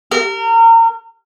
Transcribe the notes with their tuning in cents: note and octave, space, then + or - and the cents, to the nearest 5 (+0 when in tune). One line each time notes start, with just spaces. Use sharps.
A#4 -30